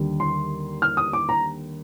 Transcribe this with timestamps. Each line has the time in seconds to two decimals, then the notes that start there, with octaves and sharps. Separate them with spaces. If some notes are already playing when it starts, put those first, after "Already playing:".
Already playing: D#2 D3 G3
0.20 C6
0.82 F6
0.97 D#6
1.13 D6
1.29 A#5